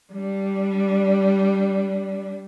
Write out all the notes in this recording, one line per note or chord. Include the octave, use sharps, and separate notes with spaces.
G3 D4